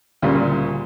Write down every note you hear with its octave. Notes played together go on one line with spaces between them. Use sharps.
D2 A#2 C#3 G3